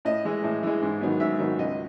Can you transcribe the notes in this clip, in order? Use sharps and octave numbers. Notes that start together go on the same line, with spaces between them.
A2 D#5
E3 G#3
A2
E3 G#3
G#2
D#3 F#3 B3
G#2 E5
D#3 F#3 B3
C#2 D#5